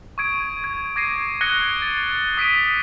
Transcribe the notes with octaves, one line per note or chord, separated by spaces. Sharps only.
C#6 D#6 G#6 D7
G#6
D6 G#6 A#6 C7 D#7
D#6 F#6 G#6 A#6 C#7 G7
A6
D#6 B6 D7 D#7